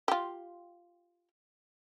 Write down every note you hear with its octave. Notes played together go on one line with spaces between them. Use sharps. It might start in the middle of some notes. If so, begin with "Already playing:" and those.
F4 G4